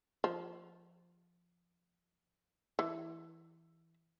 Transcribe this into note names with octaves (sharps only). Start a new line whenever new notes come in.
F3
E3